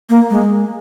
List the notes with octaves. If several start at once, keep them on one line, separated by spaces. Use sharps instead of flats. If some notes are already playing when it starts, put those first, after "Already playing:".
A#3
G#3